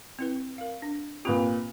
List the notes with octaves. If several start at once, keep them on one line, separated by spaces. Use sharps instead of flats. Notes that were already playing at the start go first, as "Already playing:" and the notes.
C4 E4 B4
A#4 F5
D4
A#2 C4 F4 G4 B4 F7